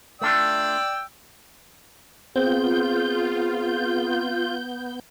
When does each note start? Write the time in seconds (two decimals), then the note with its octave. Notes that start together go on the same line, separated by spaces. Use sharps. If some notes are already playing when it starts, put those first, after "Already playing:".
0.21 A3 D4 F4 D5 G5 E6
2.36 B3 C4 F4 G#4 G6